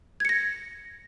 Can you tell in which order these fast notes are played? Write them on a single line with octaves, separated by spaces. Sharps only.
G#6 C#7 A#6